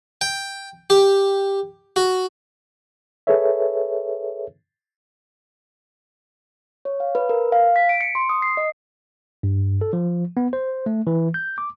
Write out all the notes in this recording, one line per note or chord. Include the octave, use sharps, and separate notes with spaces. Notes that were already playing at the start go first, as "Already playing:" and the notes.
G5
G4
F#4
G#4 A4 B4 C#5 E5
C#5
F5
B4
A#4
F5
B6
D7
C#7
C6
D#6
C7
D#5
G2
A4
F3
B3
C5
A3
E3
G6
D6